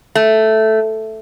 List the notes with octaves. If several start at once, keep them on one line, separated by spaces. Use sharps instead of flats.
A3